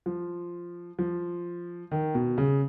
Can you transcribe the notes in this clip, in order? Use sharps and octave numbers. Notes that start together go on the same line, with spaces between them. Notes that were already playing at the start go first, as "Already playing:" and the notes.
F3
F3
D#3
B2
C#3